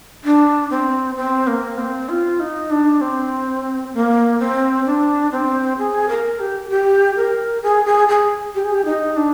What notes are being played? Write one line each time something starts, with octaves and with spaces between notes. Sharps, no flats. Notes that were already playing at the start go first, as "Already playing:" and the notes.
D4
C4
C4
A#3
C4
F4
D#4
D4
C4
A#3
C4
D4
C4
G#4
A#4
G4
G4
A#4
G#4
G#4
G#4
G4
G#4
G4
D#4
D4